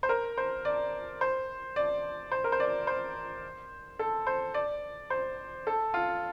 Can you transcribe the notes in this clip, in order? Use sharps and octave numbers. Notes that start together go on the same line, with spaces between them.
C5
A#4
C5
D5
C5
D5
C5
A#4
C5
D5
C5
A4
C5
D5
C5
A4
F4